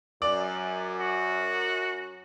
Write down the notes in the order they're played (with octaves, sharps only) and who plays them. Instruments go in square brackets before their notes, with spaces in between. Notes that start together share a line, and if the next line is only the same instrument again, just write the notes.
[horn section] F#2 [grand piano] D5
[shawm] F#4